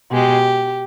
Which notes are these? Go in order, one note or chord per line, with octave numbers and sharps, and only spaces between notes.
B2 G#3 G4